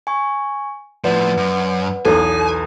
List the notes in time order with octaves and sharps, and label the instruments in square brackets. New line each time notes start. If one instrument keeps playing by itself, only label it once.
[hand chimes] G#5 C#6
[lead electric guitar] A2 F3 [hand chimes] B4 D5 F#5
[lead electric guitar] F#2
[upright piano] B1 E2 [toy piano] A4 [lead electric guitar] G#5 [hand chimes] D#6 G#6